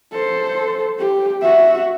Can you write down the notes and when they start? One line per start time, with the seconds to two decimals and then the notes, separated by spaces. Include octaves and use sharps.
0.12 A4 C5
0.99 G4
1.42 F#4 E5